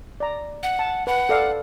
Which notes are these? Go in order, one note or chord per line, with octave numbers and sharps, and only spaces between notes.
D5 A#5
F#5
A5
B4 F#5
A4 D5 F5